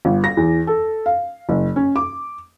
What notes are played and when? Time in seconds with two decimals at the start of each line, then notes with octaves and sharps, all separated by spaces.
0.05 G1
0.24 A#6
0.37 E2
0.67 A4
1.06 F5
1.49 F#1
1.76 C#4
1.96 D6